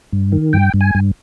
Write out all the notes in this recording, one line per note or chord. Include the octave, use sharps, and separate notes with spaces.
G2
D#3
G2 G5
G2
G#5
G2